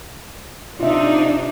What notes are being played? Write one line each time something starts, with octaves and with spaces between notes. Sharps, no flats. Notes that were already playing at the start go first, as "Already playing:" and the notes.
C3 D4 D#4 F4 E5